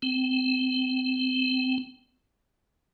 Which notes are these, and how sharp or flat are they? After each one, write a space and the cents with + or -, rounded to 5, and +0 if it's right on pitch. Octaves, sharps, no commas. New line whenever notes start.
C4 -25